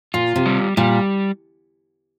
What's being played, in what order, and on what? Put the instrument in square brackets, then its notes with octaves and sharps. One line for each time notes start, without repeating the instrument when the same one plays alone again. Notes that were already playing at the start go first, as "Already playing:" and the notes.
[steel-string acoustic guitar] A#2 [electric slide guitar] F4
[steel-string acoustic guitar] C3
[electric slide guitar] G3
[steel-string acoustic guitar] A#2 [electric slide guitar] G3